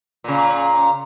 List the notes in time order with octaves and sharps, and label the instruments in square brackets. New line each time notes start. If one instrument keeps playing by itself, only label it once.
[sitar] A#2 C#3